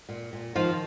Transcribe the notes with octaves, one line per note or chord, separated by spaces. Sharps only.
A#2
A#2
D#3 F3 F4